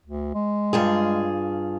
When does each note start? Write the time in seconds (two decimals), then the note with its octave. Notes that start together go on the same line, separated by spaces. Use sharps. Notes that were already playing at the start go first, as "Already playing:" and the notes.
0.06 D2
0.34 G#3
0.73 G2 F4 G#4